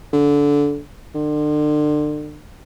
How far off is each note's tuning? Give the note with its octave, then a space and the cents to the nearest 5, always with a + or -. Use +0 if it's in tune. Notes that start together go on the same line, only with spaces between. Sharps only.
D3 -20
D3 +35